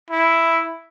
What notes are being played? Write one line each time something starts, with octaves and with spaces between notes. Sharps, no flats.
E4